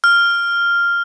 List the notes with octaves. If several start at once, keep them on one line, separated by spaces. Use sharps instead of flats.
F6